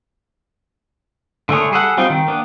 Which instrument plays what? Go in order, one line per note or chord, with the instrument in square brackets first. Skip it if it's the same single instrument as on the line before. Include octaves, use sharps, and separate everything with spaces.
[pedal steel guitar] D3 A3 D4 G#4 C#5
G3 G#4 A4 F#5
F#3 G3 C4 D#4 F4
D#3
A#3 B3 D4